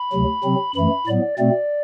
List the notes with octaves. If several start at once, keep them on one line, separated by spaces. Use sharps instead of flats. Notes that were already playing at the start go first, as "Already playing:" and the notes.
Already playing: B5
D2 C3 F#3
C3 F#3 C4
F#2 E3 A3 B5
A2 F#3 B3 D5
B2 A3 C4 D5